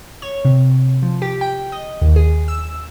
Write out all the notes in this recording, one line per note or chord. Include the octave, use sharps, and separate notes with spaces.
C#5
C3
F3
G4
G5
D#5
D#2
G#4
E6